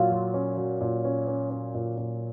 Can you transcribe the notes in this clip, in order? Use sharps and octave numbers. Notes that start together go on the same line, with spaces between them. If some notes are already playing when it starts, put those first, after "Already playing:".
Already playing: A#2 F#3 F4
F#3
C#4
F#3
A#2
C#4
C#4
C#4
A#2
A#2